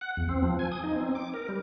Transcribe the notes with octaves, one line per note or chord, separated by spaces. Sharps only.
F#5
E2
C4
F3
G#5
D#6
D#4
C4
D6
A#4
G3